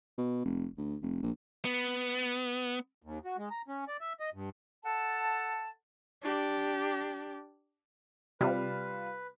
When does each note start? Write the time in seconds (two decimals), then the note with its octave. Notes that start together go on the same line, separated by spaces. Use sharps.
0.18 B2
0.45 F1
0.77 D2
1.02 F1
1.23 A#1
1.65 B3
3.03 D#2
3.25 F#4
3.38 G#3
3.51 A#5
3.68 C#4
3.88 D5
4.01 E5
4.20 D#5
4.34 G2
4.84 A4 F#5 A5
6.23 D4 G4
8.41 C3 G3 F4 B4